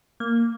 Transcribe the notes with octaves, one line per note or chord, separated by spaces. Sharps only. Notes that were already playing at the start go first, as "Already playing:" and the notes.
A#3